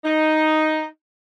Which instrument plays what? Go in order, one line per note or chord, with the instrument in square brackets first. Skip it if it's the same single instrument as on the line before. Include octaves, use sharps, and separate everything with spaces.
[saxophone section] D#4